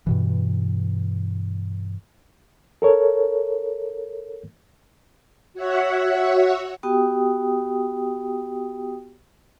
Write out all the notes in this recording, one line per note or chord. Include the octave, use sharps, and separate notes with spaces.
G2 B2 E3
A4 A#4 C#5
F#4 C#5 E5 F#5
B3 F#4 G4 G5 D#6